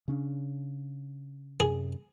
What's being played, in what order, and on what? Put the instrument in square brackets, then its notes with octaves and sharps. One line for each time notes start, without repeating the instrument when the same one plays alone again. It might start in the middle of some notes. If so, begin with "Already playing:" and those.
[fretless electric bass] C#3 C#4 D4
[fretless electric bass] F#2 C3 [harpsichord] G#4